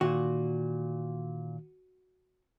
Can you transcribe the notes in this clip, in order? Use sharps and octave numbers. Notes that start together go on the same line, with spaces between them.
A#2 D#3 F#4